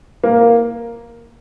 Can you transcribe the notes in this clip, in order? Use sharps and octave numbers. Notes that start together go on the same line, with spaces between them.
A#3